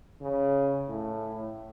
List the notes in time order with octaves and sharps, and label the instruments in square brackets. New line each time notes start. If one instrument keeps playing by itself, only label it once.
[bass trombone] C#3
A2